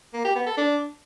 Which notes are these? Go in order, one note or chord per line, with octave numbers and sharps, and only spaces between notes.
A#3
G4
B3
A4
D4